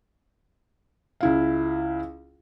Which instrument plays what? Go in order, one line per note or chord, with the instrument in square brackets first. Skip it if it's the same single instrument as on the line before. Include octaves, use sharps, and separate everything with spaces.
[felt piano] C#2 E4 F5